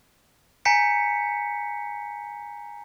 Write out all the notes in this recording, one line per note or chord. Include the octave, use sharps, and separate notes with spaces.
G#5 A#5 G6 B6 C#7